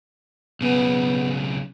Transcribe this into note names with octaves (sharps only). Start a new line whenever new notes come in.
B1 C#3 B3